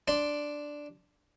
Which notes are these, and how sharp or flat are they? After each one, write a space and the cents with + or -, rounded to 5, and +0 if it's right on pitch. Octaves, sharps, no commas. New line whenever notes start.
D4 +0 D5 +0 C6 +0